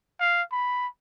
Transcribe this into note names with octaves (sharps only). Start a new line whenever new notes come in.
F5
B5